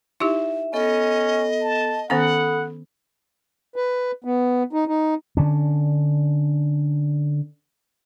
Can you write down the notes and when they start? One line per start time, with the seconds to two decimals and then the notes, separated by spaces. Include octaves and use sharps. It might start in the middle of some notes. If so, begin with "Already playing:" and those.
0.20 D#4 E4 G4 E5
0.73 B3 C#4 A4 D#5
1.61 A5
2.10 D#3 B3 C#4 A4 F#5 B5 D#6
3.76 B4
4.24 B3
4.73 D#4
4.88 D#4
5.37 D3 C#4 D4